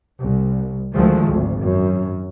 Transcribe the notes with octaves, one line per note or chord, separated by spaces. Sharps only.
C2
D2 D#3 F3 G#3 A3
G#1 D2
F#2